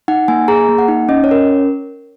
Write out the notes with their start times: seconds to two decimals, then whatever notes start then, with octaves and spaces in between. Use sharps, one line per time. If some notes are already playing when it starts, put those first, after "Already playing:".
0.08 D#4 F#5
0.28 A#3 G#5
0.48 G#4 A#5
0.69 A#3
0.78 F#5
0.88 D#4
1.09 C#4 D#5
1.24 C#5
1.29 C#4 A#4